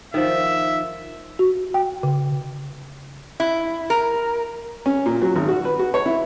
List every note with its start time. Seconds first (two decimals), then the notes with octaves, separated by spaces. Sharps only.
0.14 D#3 F3 E5
1.39 F#4
1.74 G5
2.03 C#3
3.40 E4
3.90 A#4
4.86 C#4
5.06 A#2
5.22 F#3
5.36 G#1
5.48 F#4
5.65 B4
5.79 F#4
5.94 C#5
6.06 E4